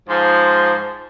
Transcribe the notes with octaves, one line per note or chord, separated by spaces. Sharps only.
G#2 F3